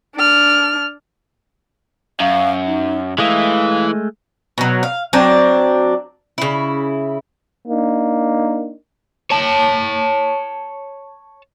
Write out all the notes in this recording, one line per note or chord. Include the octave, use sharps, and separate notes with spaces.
D4 F6
F#2 F5
D#4
E3 G#3 A3 D#5 F5
B2 F#3
F5
F#3 C4 D4
C#3 E4
A#3 D4 D#4
C#5 A5